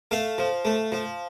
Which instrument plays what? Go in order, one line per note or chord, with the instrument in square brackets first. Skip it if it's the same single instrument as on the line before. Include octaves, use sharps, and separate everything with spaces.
[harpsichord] A3 F5
F3
A3
F3